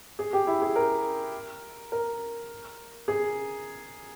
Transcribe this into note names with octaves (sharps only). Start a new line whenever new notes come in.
G#4
G4
E4
G#4
A#4
A#4
G#4